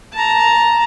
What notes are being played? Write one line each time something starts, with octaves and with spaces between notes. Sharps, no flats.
A5 A#5